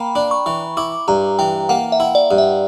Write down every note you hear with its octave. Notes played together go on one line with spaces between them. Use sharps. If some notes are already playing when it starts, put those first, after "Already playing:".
Already playing: A#3 G5 A#5 B5
D4
C#6
E3
E4 D6
G2 A#5
E3 G5
A#3 F#5
E5
E4
D5
G2
E5